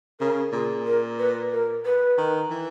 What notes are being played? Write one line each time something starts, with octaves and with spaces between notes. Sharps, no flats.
C#3 A#4
A#2 G#4
A#4
B4
A#4
B4
D#3
E3